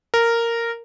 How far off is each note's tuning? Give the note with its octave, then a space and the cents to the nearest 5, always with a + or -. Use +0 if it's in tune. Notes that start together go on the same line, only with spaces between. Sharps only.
A#4 -10